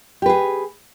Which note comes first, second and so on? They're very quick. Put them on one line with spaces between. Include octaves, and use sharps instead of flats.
G4 B4 G#4